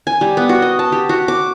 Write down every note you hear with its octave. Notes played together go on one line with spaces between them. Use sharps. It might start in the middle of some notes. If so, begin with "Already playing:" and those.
G#5
G3
B3
F#4
D#5
A5
G4
F#4
D6